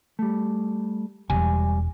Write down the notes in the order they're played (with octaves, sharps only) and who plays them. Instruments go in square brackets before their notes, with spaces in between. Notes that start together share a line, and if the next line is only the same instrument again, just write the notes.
[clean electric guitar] G3 A3
[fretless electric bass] E1 [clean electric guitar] G3 G#5